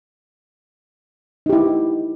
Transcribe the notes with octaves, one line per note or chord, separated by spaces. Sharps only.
D#4 E4 G4